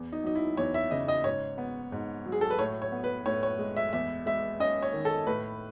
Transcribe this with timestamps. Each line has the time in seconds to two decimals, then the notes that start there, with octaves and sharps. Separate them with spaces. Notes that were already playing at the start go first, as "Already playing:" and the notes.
Already playing: E2
0.12 D#4
0.24 F#3 D#4
0.35 E4
0.57 E2 C#5
0.74 E5
0.91 C#3 D#5
1.08 D#5
1.24 G#2 C#5
1.58 B3
1.92 G#2
2.26 F#3
2.32 G#4
2.41 A4
2.50 B4
2.58 A2 C#5
2.82 C#5
2.92 B3
3.04 B4
3.25 A2 C#5
3.43 C#5
3.59 G#3
3.77 E5
3.93 E2 E5
4.26 G#3 E5
4.60 C#4 D#5
4.82 C#5
4.93 D#3
5.05 A4
5.27 A2 B4